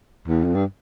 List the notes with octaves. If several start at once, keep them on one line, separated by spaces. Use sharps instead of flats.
E2
F2
G2